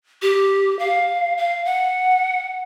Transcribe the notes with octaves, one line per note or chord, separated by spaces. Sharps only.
G4
F5
F5
F#5